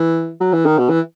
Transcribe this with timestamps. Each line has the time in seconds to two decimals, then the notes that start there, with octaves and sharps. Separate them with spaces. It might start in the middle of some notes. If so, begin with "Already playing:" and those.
Already playing: E3
0.41 F#3
0.53 E3
0.66 D#3
0.78 B2
0.90 E3